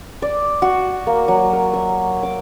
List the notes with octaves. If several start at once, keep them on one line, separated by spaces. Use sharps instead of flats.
D5
F#4
A#3
F#3
A#4
E5
D6